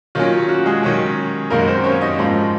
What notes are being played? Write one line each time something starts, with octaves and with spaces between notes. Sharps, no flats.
D#3 F#3 A#3 C#4 F4
F#4
G#3 G#4
D#3 F#3 C#4
F#2 D#3 G#3 A#3 A#4
C4 C5
C#4 C#5
D#4 D#5
G#2 F3 A#3